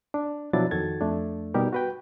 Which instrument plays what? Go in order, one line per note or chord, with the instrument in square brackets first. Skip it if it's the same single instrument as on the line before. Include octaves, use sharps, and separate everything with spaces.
[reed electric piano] D4
B2 F3 F#3 D4 E4 A6
F2 D#3 F#4 A4 G#6 A6
F2 A3 D4
B2 G3 B3 D#4 G4 A#4
F#4 B4 G5